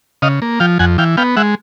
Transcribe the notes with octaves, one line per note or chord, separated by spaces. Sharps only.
C#3 D#5 F5
A#3
F3 F5 G5
F2 F#5 G#5
E3 F5 G5
B3 F5 G5
G#3 E5 F#5